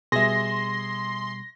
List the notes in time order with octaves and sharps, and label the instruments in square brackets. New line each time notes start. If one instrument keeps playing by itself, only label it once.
[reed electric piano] B2 G3 [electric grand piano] G#4 E5 [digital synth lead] C6 [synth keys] A#6